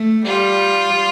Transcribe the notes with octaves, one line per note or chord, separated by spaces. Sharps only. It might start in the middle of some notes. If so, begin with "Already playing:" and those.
Already playing: A3
G3 F4